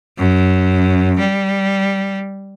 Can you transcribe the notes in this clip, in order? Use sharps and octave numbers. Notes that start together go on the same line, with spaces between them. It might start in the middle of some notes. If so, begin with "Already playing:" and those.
F#2
G3